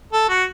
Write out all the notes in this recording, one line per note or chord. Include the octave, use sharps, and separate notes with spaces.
A4
F#4